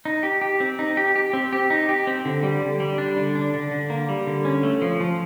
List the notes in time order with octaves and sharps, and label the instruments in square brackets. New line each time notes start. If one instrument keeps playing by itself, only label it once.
[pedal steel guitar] D#4
G4
G4
C4
D#4
G4
G4
C4
G4
D#4
G4
C4
D3
G3
D3
G3
D4
D3
D4
D3
D3
A#3
G3
D3
C#4
A3
F3
F3